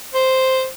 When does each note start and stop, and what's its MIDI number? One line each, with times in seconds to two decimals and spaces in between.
0.14 0.67 72